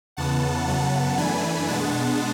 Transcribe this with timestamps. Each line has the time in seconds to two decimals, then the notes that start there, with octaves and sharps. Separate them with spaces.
0.17 E2 C#3 E3 B3 F#5 A5
0.67 F#2 C#3 F#3 B3
1.17 F#2 E3 A3 D4 G#5 B5
1.67 B2 G#3 B3 D4 F#5 A5